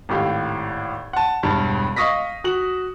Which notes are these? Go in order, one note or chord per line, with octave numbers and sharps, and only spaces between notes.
G#1 A2 G4 F5
F#5 A5
E1 G2 A5
D#5 F5 C#6 D#6 A#6 B6
F#4 F#7